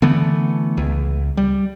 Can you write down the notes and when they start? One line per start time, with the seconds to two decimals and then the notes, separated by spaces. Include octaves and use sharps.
0.02 D3 E3 A3 B3
0.77 C#2
1.37 G3